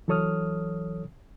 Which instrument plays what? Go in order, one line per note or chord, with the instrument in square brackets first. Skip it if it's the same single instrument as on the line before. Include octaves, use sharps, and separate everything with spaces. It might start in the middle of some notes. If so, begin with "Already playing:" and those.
[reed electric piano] E3 F#3 A4 C#5 D#6 F6